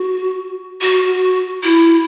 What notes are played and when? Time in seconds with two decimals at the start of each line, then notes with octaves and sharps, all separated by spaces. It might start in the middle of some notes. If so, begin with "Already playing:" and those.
Already playing: F#4
0.81 F#4
1.63 E4